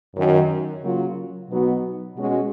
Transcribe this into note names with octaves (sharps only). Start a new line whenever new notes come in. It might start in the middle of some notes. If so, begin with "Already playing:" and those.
F#2 D#3 F#3
C#3 F#3 A#3 F4
B2 F#3 B3 D#4 F#4
B2 G#3 C#4 F#4